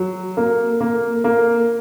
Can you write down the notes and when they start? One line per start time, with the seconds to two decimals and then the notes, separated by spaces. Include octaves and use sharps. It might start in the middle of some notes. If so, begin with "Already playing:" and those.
Already playing: F#3
0.37 A#3
0.81 A#3
1.24 A#3